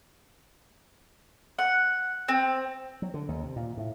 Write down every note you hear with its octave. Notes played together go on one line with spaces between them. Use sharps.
F#5
C4
F#3
D3
D#2
C3
A#2
A2